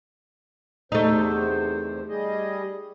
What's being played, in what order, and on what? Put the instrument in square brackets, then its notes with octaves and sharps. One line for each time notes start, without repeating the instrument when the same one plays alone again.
[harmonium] E2 C3 C5 [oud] A3 D#4
[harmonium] G3 G#4 D#5